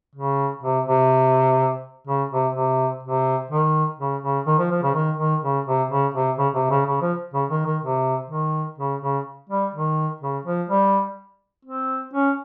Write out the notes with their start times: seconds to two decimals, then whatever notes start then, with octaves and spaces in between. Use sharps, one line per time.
0.15 C#3
0.63 C3
0.87 C3
2.07 C#3
2.31 C3
2.55 C3
3.03 C3
3.51 D#3
3.99 C#3
4.23 C#3
4.47 D#3
4.59 F3
4.71 F3
4.83 C#3
4.94 D#3
5.18 D#3
5.43 C#3
5.66 C3
5.90 C#3
6.14 C3
6.38 C#3
6.54 C3
6.70 C#3
6.86 C#3
7.02 F3
7.34 C#3
7.50 D#3
7.66 D#3
7.82 C3
8.30 D#3
8.78 C#3
9.02 C#3
9.49 G3
9.74 D#3
10.21 C#3
10.45 F3
10.70 G3
11.65 C4
12.13 C#4